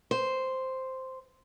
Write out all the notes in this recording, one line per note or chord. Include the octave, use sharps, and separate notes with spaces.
C5